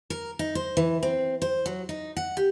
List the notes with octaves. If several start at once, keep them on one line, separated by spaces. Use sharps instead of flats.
A#4
D#4
C5
E3
C4
C5
F#3
D#4
F#5
G4